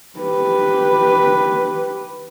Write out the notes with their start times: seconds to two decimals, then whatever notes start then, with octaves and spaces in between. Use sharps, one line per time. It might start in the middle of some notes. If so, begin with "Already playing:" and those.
0.20 G4 B4